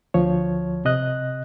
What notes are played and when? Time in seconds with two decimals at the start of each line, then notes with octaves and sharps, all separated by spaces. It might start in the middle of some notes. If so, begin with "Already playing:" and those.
0.14 D2 F3 C#5
0.85 C3 D#5 F#6